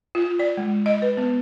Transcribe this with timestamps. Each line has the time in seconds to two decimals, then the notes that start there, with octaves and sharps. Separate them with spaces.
0.15 F4
0.39 D5
0.57 G#3
0.86 D#5
1.02 B4
1.17 B3